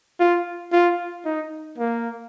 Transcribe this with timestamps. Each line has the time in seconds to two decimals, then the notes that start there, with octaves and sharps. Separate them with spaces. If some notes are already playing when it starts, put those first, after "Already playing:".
0.20 F4
0.72 F4
1.25 D#4
1.78 A#3